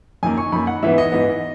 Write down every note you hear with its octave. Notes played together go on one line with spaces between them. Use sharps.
F#2 D#3 A#3 G#5
C#6
F#2 D#3 A#3 B5
F#5
G#2 E3 B3 E5
D#5
G#2 E3 B3